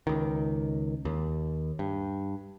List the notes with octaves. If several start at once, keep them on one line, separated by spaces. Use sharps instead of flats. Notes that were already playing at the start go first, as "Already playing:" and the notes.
C#2 D#3
D#2
G2